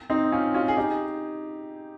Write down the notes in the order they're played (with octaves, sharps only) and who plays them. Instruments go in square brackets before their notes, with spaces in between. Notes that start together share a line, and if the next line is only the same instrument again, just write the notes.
[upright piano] C4 D#4
C#4 F4
C#4 F4
G#4
D#4 G4